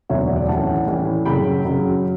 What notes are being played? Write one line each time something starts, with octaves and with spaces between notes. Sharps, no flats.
E1 D2 D3 F#3 B3 C#5 E5
D5
D5 F#5
A2 E3 G3 C#4 F#5 A5
A2 E3 G3 C#4
F#2 C#3 F#3 G5 B5
F#2 C#3 F#3